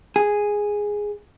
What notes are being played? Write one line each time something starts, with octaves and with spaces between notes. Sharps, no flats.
G#4